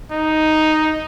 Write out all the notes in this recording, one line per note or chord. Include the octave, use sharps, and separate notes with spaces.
D#4